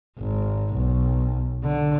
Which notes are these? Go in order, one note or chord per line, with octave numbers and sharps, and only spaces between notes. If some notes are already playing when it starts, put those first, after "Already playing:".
G#1
B1
D3